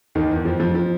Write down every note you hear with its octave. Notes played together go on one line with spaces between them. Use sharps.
D#2 D#3
E2 E3
F2 F3
F2 F3
F3